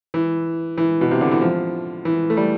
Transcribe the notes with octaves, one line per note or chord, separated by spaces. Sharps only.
E3
E3
B2
C3
D3
E3
F3
E3
A3
G3